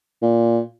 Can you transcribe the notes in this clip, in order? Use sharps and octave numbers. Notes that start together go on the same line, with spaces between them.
A#2